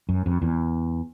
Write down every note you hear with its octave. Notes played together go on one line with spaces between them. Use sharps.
F#2
F2
E2